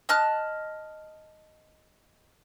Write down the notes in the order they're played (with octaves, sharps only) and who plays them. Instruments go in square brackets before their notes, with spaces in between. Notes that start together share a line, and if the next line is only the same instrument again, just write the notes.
[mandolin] D#5 A5 F6 F#6